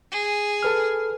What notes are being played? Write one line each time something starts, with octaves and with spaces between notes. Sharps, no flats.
G#4
A4 B4 F6